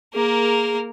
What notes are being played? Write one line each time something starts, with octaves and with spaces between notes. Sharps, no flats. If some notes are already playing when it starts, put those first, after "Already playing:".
A#3 G#4 A#4